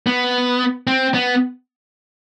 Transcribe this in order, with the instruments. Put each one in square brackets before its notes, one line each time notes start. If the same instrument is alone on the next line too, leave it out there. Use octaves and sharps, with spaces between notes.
[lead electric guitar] B3
C4
B3